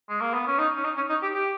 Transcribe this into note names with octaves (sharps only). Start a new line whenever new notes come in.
G#3
A#3
B3
C#4
D#4
C#4
D#4
C#4
D#4
G4
G4